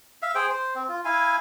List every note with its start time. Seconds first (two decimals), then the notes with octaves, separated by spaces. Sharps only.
0.22 E5 F5
0.35 G#4 C5 G5
0.50 C5
0.75 C4
0.89 F4
1.05 E4 F5 G#5